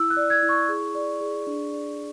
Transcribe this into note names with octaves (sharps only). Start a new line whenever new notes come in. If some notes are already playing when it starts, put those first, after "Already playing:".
Already playing: E4 E6
F#6
D5
G#6
E4
C#6
G#4
D5
G#4
D4
D5